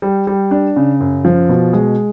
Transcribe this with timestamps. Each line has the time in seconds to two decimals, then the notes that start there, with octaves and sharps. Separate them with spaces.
0.02 G3
0.27 G3
0.51 D4
0.76 C#3
1.01 F#2
1.25 F3
1.49 B2
1.73 G#3